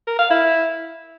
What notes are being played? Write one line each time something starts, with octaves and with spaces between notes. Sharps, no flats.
A#4
F5
E4